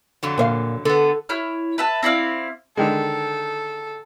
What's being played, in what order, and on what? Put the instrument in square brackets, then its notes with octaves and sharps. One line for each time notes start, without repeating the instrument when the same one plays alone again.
[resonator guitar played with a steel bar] F2 D3 F#3
[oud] A#2 C5 F5
[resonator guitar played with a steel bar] D3 B3 [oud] A4
[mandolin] E4 C#5 F6
B4 E5 A5
C4 E4 D5 F5
[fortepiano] D3 D#3 G#3 [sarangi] A4